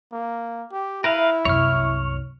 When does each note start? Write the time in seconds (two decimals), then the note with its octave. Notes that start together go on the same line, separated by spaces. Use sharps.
0.12 A#3
0.72 G4
1.04 E4 A#4 B4 E5 F5
1.45 C2 F#2 C#5 C#6 F6